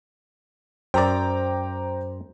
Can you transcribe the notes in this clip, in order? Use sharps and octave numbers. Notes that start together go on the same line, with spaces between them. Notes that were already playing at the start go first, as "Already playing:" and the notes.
F#2 C5 D5 G5 A#5 D6